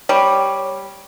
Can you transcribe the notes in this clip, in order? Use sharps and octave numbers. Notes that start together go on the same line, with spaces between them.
G3 C#5